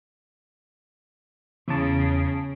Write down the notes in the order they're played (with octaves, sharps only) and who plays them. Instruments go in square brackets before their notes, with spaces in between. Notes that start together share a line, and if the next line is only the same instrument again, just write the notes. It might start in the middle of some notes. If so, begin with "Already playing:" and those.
[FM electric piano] E2 A5 [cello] C#3